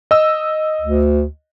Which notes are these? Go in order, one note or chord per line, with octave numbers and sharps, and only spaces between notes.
D#5 E6
D2